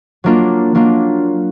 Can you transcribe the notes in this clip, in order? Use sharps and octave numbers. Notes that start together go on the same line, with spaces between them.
F#3 A#3 D4 F4
F#3 A#3 D4 F4